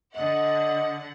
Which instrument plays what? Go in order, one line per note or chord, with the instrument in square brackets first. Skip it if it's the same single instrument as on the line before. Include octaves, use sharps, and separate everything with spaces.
[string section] D3 F#5 [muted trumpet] D#5